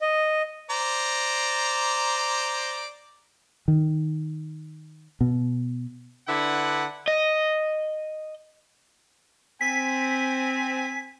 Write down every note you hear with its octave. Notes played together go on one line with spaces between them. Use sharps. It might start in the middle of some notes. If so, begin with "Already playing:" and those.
D#5
C5 D5 A#5
D#3
B2
D3 D4 E4 B4 F#5
D#5
C4 G#5 B6